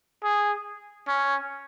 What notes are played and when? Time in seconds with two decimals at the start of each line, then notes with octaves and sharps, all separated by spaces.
0.24 G#4
1.08 C#4